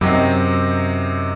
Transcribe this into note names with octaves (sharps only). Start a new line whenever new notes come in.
F#2 C3 F#3 C4 D#4